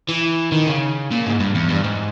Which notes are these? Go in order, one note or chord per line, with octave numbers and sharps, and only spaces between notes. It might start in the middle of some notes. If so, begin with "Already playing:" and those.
E3
D#3
C#3
A#2
G#2
G2
E2
G2
G#2